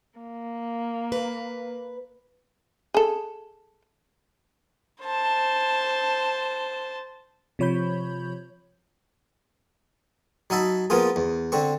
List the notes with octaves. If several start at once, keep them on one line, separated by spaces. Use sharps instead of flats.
A#3
B4
G#4 A4
C5 A5
C3 F3 C#5 B5 G6
F#3 D#4 E5 A5 B5
F3 A#3 B3 F4 G#4
E2
D3 C4 C#6